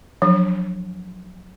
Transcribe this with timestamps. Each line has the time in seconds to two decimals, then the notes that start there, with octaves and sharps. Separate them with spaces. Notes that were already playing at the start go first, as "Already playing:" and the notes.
0.22 F3 F#3 D4